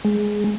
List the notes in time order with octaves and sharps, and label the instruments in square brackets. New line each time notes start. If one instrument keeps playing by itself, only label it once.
[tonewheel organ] G#3